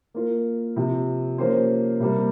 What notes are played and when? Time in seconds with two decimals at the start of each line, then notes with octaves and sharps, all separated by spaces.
0.14 A#3 F4 A#4
0.76 C3 F3 C4
1.38 F3 A#3 C#4 G4 C5
2.00 C3 G3 A#3